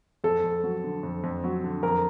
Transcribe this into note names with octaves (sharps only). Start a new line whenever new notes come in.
F2 A4
F2
F#3
D3
F2
F2
F#3
D3
F2 A#4